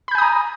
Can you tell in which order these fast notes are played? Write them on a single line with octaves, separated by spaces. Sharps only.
B5 G6 G#5 D#6 A#5